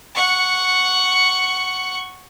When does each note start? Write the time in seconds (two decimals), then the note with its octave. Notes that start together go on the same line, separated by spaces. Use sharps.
0.15 F#5 C#6